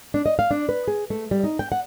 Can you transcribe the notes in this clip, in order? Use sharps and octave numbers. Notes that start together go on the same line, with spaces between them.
D4
D#5
F5
D4
B4
G#4
A3
G3
D#4
G5
F#5